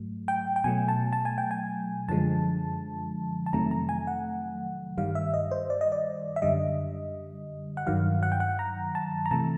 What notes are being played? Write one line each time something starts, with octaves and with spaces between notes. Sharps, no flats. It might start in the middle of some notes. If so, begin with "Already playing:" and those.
Already playing: G#2 F#3 A3
G5
G5
B2 F#3 A3 G#5
A5
A5
G#5
G5
G#5
F#2 D3 F3 G#3 A5
A5
F2 C3 D#3 F#3 A3 A#5
A#5
G#5
F#5
G2 D#3 G3 F5
E5
D#5
C5
D5
D#5
D5
E5
F#2 D3 G3 D#5
F#5
G2 D#3 F#3 F5
F#5
G5
F#5
A#5
A5
A#5
C3 E3 A3 A5